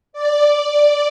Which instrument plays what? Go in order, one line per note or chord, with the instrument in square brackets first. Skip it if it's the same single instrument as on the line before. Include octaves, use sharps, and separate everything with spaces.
[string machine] D5